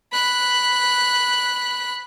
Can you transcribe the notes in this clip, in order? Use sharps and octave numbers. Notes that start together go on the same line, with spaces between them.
B5 F#6